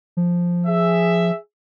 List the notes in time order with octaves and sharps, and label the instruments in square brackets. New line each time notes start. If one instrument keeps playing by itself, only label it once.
[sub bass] F3
[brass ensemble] G#4 E5